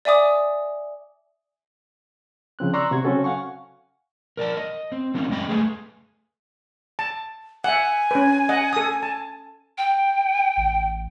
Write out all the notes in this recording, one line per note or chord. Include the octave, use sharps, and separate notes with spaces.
D5 E5 G#5 D6 D#6
C#3 F3 C4 F#6
D5 A#5 C6 C#6 E6 F#6
C3 F#4 C#6 G#6
C#3 F#3 C4 C#4 F#4 A4
F5 F#5 G#5 C#6
A#4 D5 G#5 A5
D#5
C4
F#3 A#3 C4 C#4 D#4 E4
F#2 G#3 D#5 G5 B5
A3 G#4 A4 B4 E5 G#5
A5
E5 F#5 G#5
C#4 B4
D#5 F#5
A4 D#6
A5
G5
A1